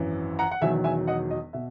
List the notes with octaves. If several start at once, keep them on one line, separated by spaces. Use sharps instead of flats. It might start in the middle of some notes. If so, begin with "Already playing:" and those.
Already playing: G#1 F#2 E3
F#5 A#5
F#5
E1 E2 D#3 F#3 E5 G#5
E5 G#5
D#5 F#5
D#5
B2 E5